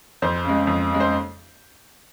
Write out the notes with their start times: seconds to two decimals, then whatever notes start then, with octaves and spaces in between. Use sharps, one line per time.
0.22 F2 C5
0.45 C#3 G#3
0.67 F2
0.90 C#3 G#3
1.00 C5